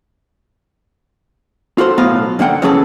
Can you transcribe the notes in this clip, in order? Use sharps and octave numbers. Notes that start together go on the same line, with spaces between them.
F4 F#4 A4 C5
B1 A2 B3 D#5 F5
F#2 D3 A#3 F#5 G5
C#3 E3 F#3 C#4 G#4 A4